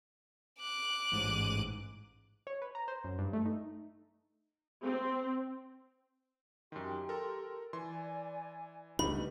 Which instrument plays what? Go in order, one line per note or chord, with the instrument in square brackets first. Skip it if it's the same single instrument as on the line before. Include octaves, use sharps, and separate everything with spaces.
[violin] D6 F#6
[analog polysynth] A1 G#2 D#7
[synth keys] C#5
B4
A#5
C5
F#2
G2
A3
D#4
[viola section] C4
[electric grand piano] F#2 D#3 [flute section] G4 G5 C6
[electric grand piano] A4 A#4
[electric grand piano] E3 C6 [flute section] D5 G#5
[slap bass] C#2 D4 [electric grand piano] G3 A3 D#4 [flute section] B4 [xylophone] B5